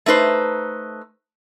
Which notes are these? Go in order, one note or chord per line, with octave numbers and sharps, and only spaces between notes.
A3 D#4 B4 C5